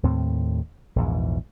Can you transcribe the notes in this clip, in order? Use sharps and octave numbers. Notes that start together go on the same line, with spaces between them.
D#2 A2 C4
A#1 E2 G#2